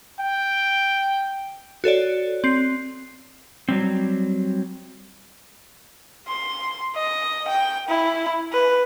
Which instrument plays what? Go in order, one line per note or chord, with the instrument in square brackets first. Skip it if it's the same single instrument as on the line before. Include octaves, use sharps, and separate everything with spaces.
[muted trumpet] G5
[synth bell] F#4 A4 C#5 D5
C4 C7
[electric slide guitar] F#3 G3 C4
[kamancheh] C6
D#5
G5
E4
B4